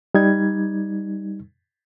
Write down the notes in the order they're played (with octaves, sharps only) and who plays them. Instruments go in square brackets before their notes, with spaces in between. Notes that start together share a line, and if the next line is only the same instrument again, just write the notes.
[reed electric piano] G3 D#4 G#6